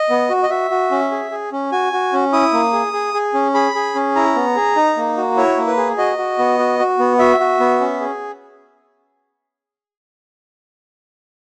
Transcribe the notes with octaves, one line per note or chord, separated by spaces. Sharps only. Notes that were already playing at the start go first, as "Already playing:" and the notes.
Already playing: D#5
B3
F#4
D#5
F#4 E5
F#4
C#4
G#4
G#4
C#4
F#4 G#5
F#4
C#4
E4 D#6
A#3
G#4
G#4
G#4
C#4
G#4 B5
G#4
C#4
E4 A#5
B3
G#4
D#4
A#3
F#4
E4 C#5
A#3
B4
G#4
F#4 D#5
F#4
B3
F#4
F#4
B3
F#4 E5
F#4
B3
C#4
G#4